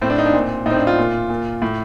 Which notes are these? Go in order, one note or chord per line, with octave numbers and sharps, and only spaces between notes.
A2 C4
D4
D#4
D4
A#2 C4
A2 D#4
C4
D4
F4
A#2
A#2
A2